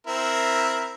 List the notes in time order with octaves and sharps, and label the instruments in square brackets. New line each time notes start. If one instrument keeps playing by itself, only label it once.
[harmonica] C4 E4 A#4